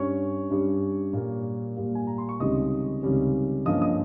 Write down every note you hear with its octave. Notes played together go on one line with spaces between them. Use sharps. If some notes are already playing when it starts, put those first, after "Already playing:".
Already playing: G2 G3 C#4 C#5 C#6
G2 G3 C#4
A#2 G3 A#3
A#2 G3 A#3
G#5
A#5
C6
C#6
C#2 C3 D#3 G3 C#4 D#5 D#6
C#2 C3 D#3 G3 C#4
G2 F3 A#3 C#4 D#5 D#6
D#5 D#6